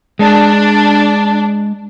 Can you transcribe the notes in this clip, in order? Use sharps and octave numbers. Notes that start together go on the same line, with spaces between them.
G#3 D4